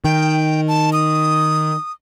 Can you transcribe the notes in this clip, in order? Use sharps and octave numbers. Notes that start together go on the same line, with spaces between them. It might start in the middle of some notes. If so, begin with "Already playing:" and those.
D#3 G5
A5
D#6